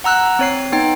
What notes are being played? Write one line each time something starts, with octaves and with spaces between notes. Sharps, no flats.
F#5 A#5 E6 F#6
C4 C#5 C7
B3 D#4 G5